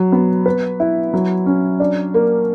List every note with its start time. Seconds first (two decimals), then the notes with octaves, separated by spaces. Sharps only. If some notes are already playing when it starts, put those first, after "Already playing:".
Already playing: F#3
0.12 B3
0.46 B4
0.80 E4
1.14 F#3
1.46 C#4
1.80 D4
2.14 A#3